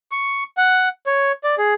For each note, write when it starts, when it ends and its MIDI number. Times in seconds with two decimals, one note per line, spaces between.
0.11 0.44 85
0.57 0.89 78
1.06 1.32 73
1.44 1.55 74
1.58 1.74 68